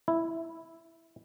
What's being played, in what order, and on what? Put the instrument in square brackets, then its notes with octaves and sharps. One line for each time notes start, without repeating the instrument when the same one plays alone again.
[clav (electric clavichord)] E4